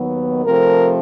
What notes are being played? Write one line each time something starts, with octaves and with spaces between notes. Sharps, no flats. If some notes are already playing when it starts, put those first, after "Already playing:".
Already playing: D#2 D#3 F#3 B3
C3 F3 A3 C4 A#4